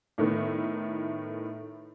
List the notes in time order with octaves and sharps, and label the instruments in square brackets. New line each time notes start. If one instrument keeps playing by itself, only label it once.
[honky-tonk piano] A2 D#3 A3 B3